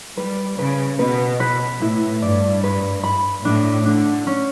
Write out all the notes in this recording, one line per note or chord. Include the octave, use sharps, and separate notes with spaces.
G3 B4
C#3 B4
B2 B4
B4
A2 E4
G2 D5
B4
B5
A2 D4
D3 D4
C#4